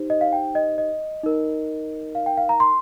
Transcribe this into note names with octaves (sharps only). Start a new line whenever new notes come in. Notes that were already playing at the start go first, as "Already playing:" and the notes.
Already playing: D#4 G4 C5
D#5
F5
G5
D#5
D#5
D#4 A#4
F5
G5
F5
A#5
C6